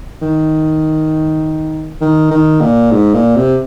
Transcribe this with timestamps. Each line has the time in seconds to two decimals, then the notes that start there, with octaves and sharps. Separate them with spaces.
0.22 D#3
2.01 D#3
2.31 D#3
2.61 A#2
2.91 G#2
3.14 A#2
3.36 C3